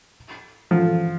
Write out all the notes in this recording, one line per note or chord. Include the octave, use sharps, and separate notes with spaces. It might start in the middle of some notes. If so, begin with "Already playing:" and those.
F3